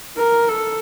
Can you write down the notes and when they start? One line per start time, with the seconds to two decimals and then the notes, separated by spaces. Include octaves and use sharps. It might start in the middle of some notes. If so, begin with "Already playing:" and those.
0.17 A#4
0.49 A4